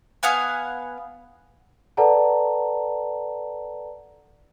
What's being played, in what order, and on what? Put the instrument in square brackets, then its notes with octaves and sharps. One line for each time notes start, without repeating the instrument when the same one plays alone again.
[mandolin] B3 F5 F#5 G#5
[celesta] A4 B4 D5 F#5 A5 A#5